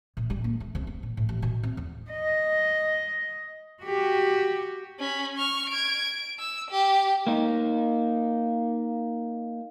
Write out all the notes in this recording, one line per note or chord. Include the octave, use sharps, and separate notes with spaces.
A#2
G3
A#3
A3
C2
B3
A#2
A2
A1
B2
C4
E2
D#5
F#4 G4
C#4 B5
C#6 F6
G#6 D7
D7
E6
G4
A#3 D#4